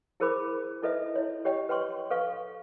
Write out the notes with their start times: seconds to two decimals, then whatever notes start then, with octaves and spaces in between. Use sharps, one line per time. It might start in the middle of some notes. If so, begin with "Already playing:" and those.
0.20 E4 G#4 A#4 C5 B5 D6
0.82 D#4 E4 A4 B4 D#5 E5
1.15 E4 C#5
1.45 G4 C#5 D#5 G5
1.69 B4 G5 C6 C#6
2.10 A4 B4 F5 C#6